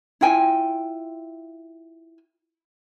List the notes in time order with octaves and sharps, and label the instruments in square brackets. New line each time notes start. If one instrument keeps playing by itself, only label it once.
[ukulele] E4 F4 G5 G#5